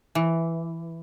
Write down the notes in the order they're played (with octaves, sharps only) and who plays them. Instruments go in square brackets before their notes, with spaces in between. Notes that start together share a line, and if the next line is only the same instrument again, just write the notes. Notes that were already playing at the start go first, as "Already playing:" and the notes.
[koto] E3